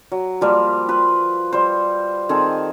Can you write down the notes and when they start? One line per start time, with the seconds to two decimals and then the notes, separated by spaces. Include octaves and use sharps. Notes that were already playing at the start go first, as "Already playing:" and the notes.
0.12 F#3
0.41 F3 G3 A#3
0.88 F4 B4
1.53 G3 C5
2.29 D#3 C4 G#4 A4